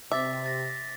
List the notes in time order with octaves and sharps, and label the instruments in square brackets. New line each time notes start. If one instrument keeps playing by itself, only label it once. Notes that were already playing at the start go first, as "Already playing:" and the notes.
[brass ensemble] C3 [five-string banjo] E5 [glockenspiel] D6 A6 B6
[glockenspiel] A6 A#6